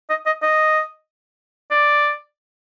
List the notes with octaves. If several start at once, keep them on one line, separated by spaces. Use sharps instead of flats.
D#5
D#5
D#5
D5